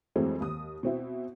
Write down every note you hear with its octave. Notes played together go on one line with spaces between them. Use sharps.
F2 E3 F#3 G#3 A3 C4
D#2 D#6
B2 C4 E4